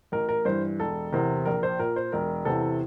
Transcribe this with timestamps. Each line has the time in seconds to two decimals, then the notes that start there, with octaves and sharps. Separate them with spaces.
0.12 A1 A#4
0.29 A#4
0.45 G2 E3 C5
0.80 E1 A4
1.13 E2 C3 E3 A#4
1.45 A#1 A#4
1.63 C5
1.79 A#2 A#4
1.96 C5
2.12 E1 A#4
2.45 E2 C3 E3 A4